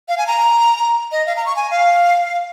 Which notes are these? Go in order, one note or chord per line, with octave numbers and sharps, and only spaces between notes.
F5
G#5
A#5
D#5
F5
A#5
C#6
G#5
F5